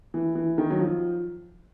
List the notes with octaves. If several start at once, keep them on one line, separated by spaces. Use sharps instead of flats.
E3
E3
D#3
F#3
F3